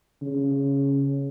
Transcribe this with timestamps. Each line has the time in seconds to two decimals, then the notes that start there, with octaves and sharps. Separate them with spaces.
0.22 C#3